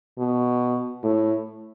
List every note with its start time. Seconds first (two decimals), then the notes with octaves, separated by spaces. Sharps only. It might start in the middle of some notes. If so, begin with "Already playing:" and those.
0.18 B2
1.03 A2